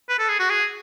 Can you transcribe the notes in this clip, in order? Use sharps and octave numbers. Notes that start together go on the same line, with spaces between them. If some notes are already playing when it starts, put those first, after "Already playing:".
B4
A4
G#4
F#4
G#4